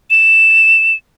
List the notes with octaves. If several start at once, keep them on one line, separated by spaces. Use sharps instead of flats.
E7